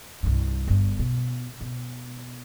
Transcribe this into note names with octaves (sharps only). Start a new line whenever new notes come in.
C2 G2
G1 G2
B2
B2